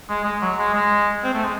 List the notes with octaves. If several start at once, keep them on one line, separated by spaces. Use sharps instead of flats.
G#3
G#3
F#3
G#3
G#3
C4
A3
G#3